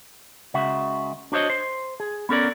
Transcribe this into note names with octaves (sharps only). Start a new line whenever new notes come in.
C#2 C#3 F#4 E5
D4 F#4 C5 C#5 D#5
C5
G#4
B3 C#4 A4 A#4 D5